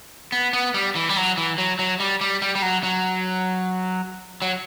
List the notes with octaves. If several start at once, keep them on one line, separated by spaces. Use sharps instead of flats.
B3
B3
G3
E3
G3
F#3
E3
F#3
F#3
G3
G3
G3
G3
F#3
F#3
F#3